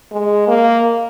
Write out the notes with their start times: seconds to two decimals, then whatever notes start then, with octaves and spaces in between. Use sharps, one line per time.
0.12 G#3
0.47 A#3